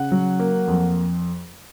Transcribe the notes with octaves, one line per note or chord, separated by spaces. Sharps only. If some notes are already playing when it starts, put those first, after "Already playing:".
Already playing: C#3 F#5
F#3
A#3
F2